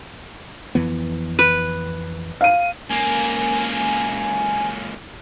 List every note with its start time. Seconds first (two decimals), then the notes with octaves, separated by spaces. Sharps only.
0.75 F2 E3 B3
1.39 B4
2.41 F5 D#7
2.89 C#2 A#3 G#5